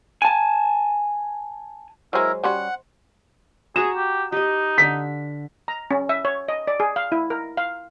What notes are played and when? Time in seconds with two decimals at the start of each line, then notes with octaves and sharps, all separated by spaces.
0.22 G#5 A5
2.13 F#3 G#3 E4 A#4 C5 D#5
2.44 G3 C#4 F#4 F#5 C6
3.76 F#4 G#4 A#5 E7
3.96 G4
4.32 D#4 G4 D#5
4.78 D3 B6
5.68 A#5
5.91 C#4
6.09 E5
6.25 C#5
6.48 D#5
6.67 D5
6.80 G#4
6.96 F5
7.12 E4
7.30 A#4
7.57 F5